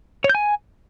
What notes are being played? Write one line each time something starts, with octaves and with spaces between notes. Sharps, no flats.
C#5
G6
G#5